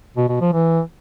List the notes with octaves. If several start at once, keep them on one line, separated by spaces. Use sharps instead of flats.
B2
B2
F3
E3